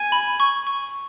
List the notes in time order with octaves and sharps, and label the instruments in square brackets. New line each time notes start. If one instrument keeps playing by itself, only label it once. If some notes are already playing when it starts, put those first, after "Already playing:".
Already playing: [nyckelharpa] G#5
[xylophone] B5
C#6
C#6